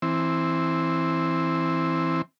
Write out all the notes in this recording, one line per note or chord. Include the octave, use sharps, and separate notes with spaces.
E3 C4